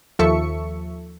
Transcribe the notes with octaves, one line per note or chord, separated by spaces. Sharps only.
D#2 F3 A4 E5 C#6 C#7